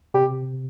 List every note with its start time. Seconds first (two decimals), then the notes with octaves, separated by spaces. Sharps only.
0.14 C3 G4